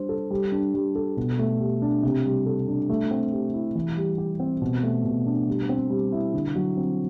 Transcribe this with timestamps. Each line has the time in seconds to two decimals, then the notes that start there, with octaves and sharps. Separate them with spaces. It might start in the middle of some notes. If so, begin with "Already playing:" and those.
Already playing: G3 D4 C5
0.09 A4
0.31 G3
0.52 D4
0.74 G3
0.95 A4
1.17 B2
1.39 A3
1.61 G4
1.82 D4
2.03 C3
2.25 G3
2.46 A4
2.68 D4
2.90 A3
3.11 C4
3.32 G4
3.54 E4
3.75 E3
3.97 G3
4.18 G4
4.40 C4
4.62 B2
4.83 A3
5.05 B2
5.26 D4
5.48 G3
5.69 C4
5.90 G3
6.12 E4
6.34 D3
6.55 F#3
6.77 C4